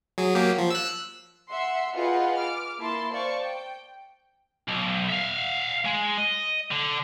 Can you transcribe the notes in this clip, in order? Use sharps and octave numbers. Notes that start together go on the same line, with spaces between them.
F#3 G#4
F#3 A#3 G4
F3
E6 F#6
E5 F#5 C6
F4 G#4 B4 D#5 F#5 G5
D6 F6
A#3 E4 A5 C6
C5 D5 F5 A5 C#6
G5
B1
E5 F5
G#3
D#5
D3